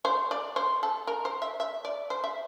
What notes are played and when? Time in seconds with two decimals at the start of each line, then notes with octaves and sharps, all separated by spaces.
0.05 C5
0.31 D5
0.56 C5
0.83 A4
1.07 A#4
1.25 C5
1.42 E5
1.60 E5
1.85 D5
2.10 C5
2.24 E5